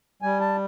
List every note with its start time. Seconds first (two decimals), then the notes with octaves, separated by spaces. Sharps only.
0.22 G3 G#5
0.40 A5